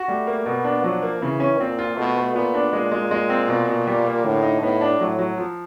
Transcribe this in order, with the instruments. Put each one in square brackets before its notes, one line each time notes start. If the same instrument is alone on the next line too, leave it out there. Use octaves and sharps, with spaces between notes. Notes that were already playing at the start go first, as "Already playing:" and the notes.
Already playing: [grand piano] F#4
[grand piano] G3 [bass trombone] A3
[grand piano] A#3
[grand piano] B2 [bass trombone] B3
[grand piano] D4
[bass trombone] F3 [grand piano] F#3
[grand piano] A#3
[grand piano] C#3 [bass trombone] E3
[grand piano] C#4
[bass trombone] A#2 [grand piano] C4
[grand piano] F4
[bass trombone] B2 [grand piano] A3
[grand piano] A3
[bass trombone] A#2 [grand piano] B3
[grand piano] D4
[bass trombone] A#2 [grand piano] G#3
[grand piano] G#3
G#3
C4
B2
B2
G3
A#3
[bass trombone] A2 [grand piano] D3
[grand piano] D#4
[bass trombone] A2 [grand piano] B3
[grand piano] D4
[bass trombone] A2 [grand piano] F#3
[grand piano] F#3
F3